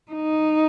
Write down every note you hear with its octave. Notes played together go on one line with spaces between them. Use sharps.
D#4